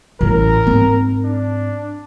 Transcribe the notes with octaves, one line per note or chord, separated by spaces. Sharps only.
A1 A2 A#4
G#2 C4
D4